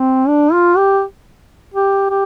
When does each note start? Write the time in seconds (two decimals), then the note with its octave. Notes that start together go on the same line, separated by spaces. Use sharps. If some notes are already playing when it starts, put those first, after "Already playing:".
Already playing: C4
0.28 D4
0.52 F4
0.77 G4
1.74 G4
2.10 G4